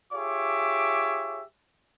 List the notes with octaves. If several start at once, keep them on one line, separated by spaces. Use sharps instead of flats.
F4 G4 G#4 C#5 E5 D6